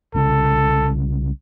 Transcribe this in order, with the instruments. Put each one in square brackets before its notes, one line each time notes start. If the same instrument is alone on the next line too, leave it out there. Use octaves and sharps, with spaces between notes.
[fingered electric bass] C2 C#3 [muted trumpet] A4